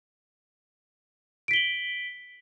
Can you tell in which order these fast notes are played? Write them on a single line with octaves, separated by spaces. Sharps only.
D7 B6 G7 F#7